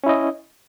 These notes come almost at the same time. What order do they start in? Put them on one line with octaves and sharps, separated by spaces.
C#4 E4 D#5